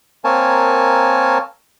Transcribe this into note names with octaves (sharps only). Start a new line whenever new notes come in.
A#3 C4 A#4 C#5 G#5 A5